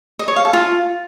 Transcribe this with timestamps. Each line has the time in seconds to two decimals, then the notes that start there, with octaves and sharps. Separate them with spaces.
0.19 D#5
0.28 C#5
0.36 F5
0.45 A4
0.53 F4